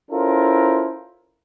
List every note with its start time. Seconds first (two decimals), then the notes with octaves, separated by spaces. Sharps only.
0.11 C#4 E4 F4 A4 A#4 C5